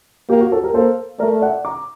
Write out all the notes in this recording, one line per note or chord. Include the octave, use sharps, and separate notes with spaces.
A#3 G4
F#4
F#4 A4
G4 A#4
A#3 A4 C5
A3 A#4 D5
D5 F#5
A#5 D6